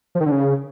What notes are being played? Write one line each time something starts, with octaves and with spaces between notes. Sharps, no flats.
F3
D#3
D3
C#3